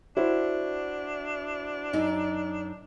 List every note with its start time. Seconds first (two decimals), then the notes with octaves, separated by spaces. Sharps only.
0.17 D4 E4 F#4 C5
1.93 F#2 D#4